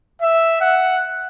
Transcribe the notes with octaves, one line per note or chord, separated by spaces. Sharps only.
E5
F#5